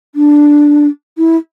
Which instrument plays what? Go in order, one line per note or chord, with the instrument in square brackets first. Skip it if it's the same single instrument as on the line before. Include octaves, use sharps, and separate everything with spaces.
[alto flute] D4
E4